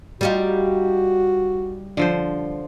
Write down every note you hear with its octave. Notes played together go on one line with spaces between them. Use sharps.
G3 D#4 F4 F#4
D3 F3 C5